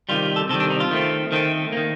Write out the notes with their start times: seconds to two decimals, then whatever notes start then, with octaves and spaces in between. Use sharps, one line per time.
0.09 C3 D#3 G3 F4
0.23 F4
0.36 A4
0.49 C3 D#3 G3 A4
0.60 D4
0.70 D#4
0.80 F4
0.91 D#3 A3 C4
1.32 D#3 A3 C4
1.73 D#3 A#3